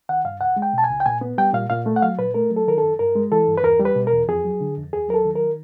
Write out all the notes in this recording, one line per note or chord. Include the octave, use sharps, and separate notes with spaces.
D#3 F#5
G2 F5
C#2 F#5
G#3
G5
B2 A5
G#5
C#2
G5
A#2 G#5
B3
G3 G5
A#2 F5
A#2 F5
A3
F#5
F#3 F5
A#2 B4
A3 A#4
F#3
A4
D#3 A#4
A4
F#2
G2 A#4
G#3
E3 A4
G2
B4
E2 A#4
G3
B4
B2
A#4
E2
F2 G#4
F#3
D3
F2
D#2 G#4
F#3 A#4
A4
D#3
A#4